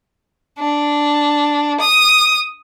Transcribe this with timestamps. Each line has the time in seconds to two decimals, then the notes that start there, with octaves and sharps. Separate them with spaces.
0.59 D4
1.80 D#6